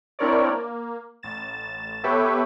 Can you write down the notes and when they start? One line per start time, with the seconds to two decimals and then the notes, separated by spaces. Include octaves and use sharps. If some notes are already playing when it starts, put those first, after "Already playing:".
0.19 C4 D4 E4 A#4 C#5 D5
0.49 A#3
1.23 A1 A6 E7
2.04 B3 G4 A4 B4 C#5 E5